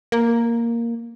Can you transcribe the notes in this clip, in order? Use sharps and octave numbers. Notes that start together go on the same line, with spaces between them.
A#3